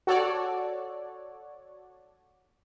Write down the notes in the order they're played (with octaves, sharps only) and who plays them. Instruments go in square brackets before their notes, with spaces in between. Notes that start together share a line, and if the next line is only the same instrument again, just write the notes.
[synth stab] F#4 A4 C#5 D5